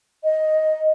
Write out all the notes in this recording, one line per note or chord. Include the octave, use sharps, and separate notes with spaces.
D#5